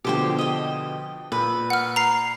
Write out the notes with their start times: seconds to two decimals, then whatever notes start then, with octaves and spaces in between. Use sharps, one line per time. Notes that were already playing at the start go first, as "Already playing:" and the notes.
0.05 B2 D3 F3 G4 C5 G5
0.39 D#5 G5
1.32 A#2 B4
1.70 F#5 F6
1.96 A#5 C7